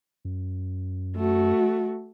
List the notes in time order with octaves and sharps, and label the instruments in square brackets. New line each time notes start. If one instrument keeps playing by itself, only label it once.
[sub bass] F#2
[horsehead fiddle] A3 F#4